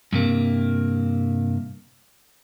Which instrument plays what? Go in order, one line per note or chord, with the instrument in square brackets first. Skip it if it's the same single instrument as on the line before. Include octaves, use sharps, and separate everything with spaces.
[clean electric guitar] G2 C3 A#3